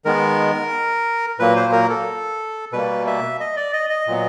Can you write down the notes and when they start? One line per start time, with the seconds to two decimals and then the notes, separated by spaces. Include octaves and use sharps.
0.05 D#3 G#3 B3 A#4
1.39 A#2 F#3 A#3 B4
1.56 C5
1.72 A#4
1.90 A4
2.72 B2 G3 A#3 B4
3.07 E5
3.40 D#5
3.57 D5
3.73 D#5
3.90 D#5
4.07 A#2 F#3 B3